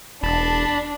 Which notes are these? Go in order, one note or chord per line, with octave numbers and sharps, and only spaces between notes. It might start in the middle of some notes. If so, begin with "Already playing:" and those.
E1 D4 A5 B5